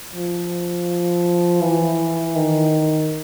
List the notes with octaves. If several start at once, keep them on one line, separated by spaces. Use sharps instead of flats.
F3
E3
D#3